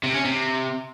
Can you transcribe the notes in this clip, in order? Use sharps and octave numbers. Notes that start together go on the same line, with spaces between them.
C3
C#4
C3